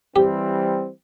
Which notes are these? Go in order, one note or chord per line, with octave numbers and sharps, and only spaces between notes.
E3 G3 C4 G4